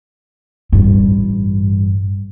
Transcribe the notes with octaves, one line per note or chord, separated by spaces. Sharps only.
A1 G2